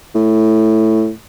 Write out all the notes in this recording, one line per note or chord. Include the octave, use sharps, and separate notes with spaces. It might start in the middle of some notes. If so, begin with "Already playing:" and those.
A2